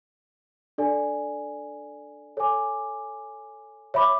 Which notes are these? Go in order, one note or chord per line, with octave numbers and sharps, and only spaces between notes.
D4 A4 D5 G#5
A4 C#5 G#5 D6
C#5 E5 B5 D6